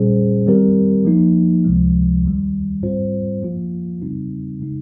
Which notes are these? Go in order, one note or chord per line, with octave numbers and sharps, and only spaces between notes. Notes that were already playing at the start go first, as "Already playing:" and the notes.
Already playing: A#2 G3 C#4 G#4 C5
D#3 G3 C4 G4 A#4
F3 A#3 D#4
C#2 C3 F3 G#3
D#2 D#3 G3
G#2 G3 C4 F4 C5
F3 A#3 F4
C#3 G3 C4 D#4
C#3 G#3 D#4